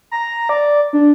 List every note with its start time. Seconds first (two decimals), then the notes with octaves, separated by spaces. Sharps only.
0.11 A#5
0.49 D5
0.93 D4